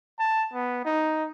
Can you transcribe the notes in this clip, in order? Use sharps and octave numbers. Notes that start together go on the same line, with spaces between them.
A5
B3
D#4